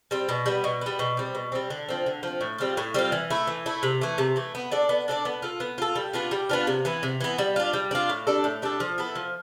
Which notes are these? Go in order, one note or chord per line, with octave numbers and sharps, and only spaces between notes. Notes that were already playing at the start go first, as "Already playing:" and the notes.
G3 C4
B2
G3 B3
B2
G3 B3
B2
G3 C4
B2
G3 C4
D3
F3 C4
D3
F3 C4
A2
G3 C4 F4
A2
G3 C4 F4
E3
A3 E4
E3
A3 E4
C3
E3 A3
C3
E3 A3
B3
D4 A4 D5
B3
D4 A4 D5
B3
F4 A4
B3
F4 A4
G3
B3 D4 F4
G3
B3 D4 F4
C3
E3 B3
C3
E3 B3
G3
D4 F4
G3
D4 F4
A2
G3 D4 A4
A2
G3 D4 A4
F3
B3 E4 A4
F3